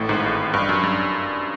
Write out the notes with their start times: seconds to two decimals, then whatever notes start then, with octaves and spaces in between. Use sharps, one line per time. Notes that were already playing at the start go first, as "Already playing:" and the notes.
Already playing: A1 A2
0.09 G#1 G#2
0.54 G2
0.69 F#2
0.83 G2